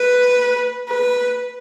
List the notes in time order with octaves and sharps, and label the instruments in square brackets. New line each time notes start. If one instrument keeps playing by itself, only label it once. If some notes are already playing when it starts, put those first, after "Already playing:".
Already playing: [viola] B4
B4